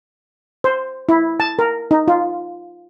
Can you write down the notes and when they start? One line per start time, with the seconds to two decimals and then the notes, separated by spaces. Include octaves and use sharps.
0.64 C5
1.09 E4
1.40 A5
1.59 A#4
1.91 D#4
2.08 F4